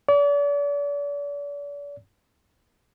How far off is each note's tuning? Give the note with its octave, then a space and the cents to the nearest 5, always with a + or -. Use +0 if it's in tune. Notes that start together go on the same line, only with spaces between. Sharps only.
D5 -40